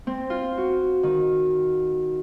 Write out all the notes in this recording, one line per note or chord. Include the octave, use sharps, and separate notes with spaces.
C4
F4
F#4
D#3